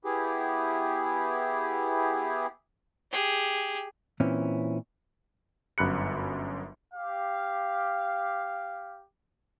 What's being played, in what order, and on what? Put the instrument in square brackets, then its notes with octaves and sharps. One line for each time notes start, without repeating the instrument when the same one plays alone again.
[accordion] B3 E4 G4 G#4
[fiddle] G4 G#4
[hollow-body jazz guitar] A#2 E3 C4 C#4 E4
[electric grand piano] G1 F#2 B5 F#6 C#7
[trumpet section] G4 F5